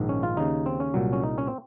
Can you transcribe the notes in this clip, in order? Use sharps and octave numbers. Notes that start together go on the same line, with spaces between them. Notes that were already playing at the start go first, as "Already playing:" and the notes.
Already playing: A#1 G#2 D#3
C#4
F4
D#2 C#3 D#4
C4
C#4
C2 A#2 F#3
C#4
D#4
C#4
C4